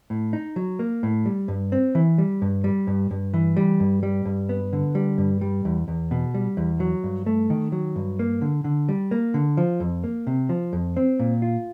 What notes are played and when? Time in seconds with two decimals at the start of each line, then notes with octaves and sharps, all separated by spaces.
0.10 A2
0.33 D#4
0.56 F#3
0.79 A#3
1.03 A2
1.26 G3
1.48 G2
1.72 C4
1.95 E3
2.18 G3
2.42 G2
2.64 G3
2.87 G2
3.11 G2
3.34 E3
3.57 G3
3.80 G2
4.03 G3
4.25 G2
4.49 B3
4.73 D3
4.95 G3
5.18 G2
5.41 G3
5.65 E2
5.88 E2
6.11 B2
6.34 G3
6.57 E2
6.80 F#3
7.04 G2
7.26 A3
7.50 D#3
7.72 F#3
7.96 G2
8.19 A#3
8.42 D3
8.64 D3
8.89 G3
9.11 A#3
9.34 D3
9.57 F3
9.80 F2
10.04 A#3
10.27 C3
10.49 F3
10.73 F2
10.97 C4
11.20 A#2
11.42 F4